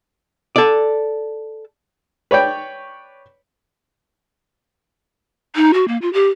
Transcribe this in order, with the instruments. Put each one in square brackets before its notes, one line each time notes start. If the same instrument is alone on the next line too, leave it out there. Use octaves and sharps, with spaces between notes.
[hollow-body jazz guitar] A4 D5
[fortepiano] B4 C#5 D5 G5
[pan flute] D#4
F#4
A#3
F4
G4